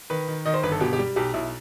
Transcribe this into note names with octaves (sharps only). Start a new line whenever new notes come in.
D#3 B4
D#3
D#3 D#5
C5
G1 B4
A4
B2 G4
G4
G3
B1 G4
B1 E4